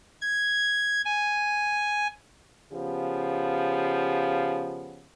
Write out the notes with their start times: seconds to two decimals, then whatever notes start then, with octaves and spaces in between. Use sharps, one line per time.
0.21 G#6
1.05 G#5
2.72 C#3 F3 B3 G4